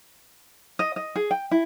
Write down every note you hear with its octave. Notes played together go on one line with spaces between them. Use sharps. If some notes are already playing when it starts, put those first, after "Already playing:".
D#5
D#5
G#4
G5
E4